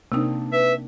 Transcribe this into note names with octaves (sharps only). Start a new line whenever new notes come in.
C3 A#3 C4 D4 D#4
B4 E5